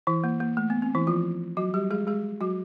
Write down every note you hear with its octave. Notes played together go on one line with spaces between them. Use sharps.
E3 E4
A#3
A#3
A3
B3
C4
E3 E4
F3 F4
F#3 F#4
G3 G4
G#3 G#4
G#3 G#4
F#3 F#4